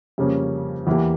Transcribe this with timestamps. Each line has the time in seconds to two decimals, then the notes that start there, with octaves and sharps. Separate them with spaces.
0.18 F2 C#3 G3 A#3 C#4
0.87 E2 E3 A#3 E4 G4